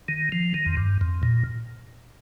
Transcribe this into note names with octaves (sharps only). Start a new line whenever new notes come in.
D#3
F3
D#3
F2
G2
F2
A#2